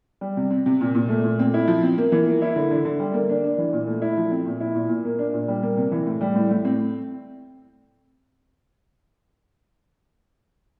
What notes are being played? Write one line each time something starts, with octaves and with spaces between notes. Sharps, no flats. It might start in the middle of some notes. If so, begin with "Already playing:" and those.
G3
C3
C4
C3
A#2
A#2
A3
A#2
C4
E4
F3
C4
A#3
E3
A#3
E4
D3
D3
D3
G3
A#3
D4
D4
E3
A#2
A3
E4
F3
C4
A#2
E4
A#2
A#2
A#3
D4
A#2
G3
A#3
C3
E3
A2
G3
A2
A2
C4